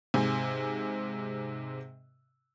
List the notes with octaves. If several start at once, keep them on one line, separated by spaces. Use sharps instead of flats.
G#2 C3 G#5